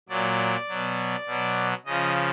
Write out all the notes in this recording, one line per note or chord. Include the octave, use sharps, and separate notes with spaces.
A#2 F#3 D5
B2 F#3
B2 F#3
C#3 F3 D#5